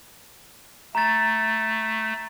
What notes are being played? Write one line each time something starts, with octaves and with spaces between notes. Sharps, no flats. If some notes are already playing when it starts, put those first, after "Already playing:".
A3 A#5 A6